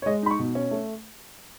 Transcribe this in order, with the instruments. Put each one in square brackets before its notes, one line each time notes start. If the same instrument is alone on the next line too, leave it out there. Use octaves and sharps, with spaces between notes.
[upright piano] C#5
G#3 D#5
D#4 B5
C#6
B2
C#4
A3